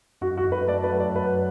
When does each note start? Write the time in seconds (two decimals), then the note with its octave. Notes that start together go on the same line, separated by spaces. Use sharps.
0.21 F#2 F#4
0.37 F#4
0.45 F#2
0.52 B4
0.68 A3 D5
0.84 B4
0.92 F#3
1.00 D5
1.15 F#2 B4